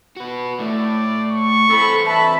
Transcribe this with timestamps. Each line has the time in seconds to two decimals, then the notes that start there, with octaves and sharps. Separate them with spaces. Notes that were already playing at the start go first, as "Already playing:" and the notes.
0.16 F#4 B4
0.60 A2 A3 D5
1.30 C#6
1.70 E3 C4 A4 B5
2.06 E5 A5 B5